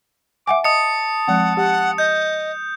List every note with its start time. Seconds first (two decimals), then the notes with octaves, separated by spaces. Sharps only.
0.48 E5 F#5 G#5 D6
0.64 D#5 A5 D#6 C#7
1.28 F3 G#3 C4 F#5
1.57 G4 F#5
1.98 D#5 G6